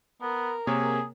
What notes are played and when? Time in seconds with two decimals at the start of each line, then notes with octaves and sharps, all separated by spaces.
0.22 B3 A#4
0.67 C3 A#3 G#4 C#5